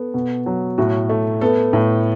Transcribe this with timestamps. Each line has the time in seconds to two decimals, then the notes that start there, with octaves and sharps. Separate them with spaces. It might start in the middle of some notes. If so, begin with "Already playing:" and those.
Already playing: B3 A4
0.14 B2
0.46 F#3
0.78 A2 F#4
1.09 A3
1.41 B3 A4
1.73 A2